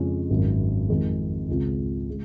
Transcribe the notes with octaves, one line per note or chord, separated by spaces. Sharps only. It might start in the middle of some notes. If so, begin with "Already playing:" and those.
Already playing: F2 C#3 G#3 C#4 F4
G#1 F#2 D#3
F2 D#3 G#3
C#2 C#3 G#3 C4 F4
C#3 G#3